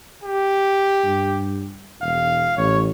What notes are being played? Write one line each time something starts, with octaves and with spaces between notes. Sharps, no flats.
G4
G2
E1 F5
A1 C#5